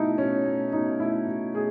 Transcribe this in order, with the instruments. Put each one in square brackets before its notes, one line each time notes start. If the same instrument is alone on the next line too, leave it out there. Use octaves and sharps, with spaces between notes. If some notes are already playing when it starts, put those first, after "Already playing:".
Already playing: [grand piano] B2 A3 D#4 E4
B2 C#4
A3
B2 D#4
A3 E4
B2
A3 G#4